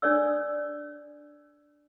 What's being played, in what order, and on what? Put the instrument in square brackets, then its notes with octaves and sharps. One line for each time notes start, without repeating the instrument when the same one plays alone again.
[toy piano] D4 A4 C#5 D5 E6